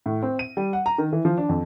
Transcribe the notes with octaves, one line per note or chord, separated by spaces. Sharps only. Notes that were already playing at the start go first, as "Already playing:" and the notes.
A2
C4
D#7
G3
F#5
A#5
D#3
E3
F3
D4
F2